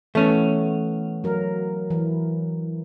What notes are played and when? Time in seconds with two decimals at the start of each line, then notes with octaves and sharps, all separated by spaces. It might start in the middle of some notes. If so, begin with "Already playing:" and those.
0.15 E3 A3 B3 C#4
1.24 F#3 A#4
1.90 E3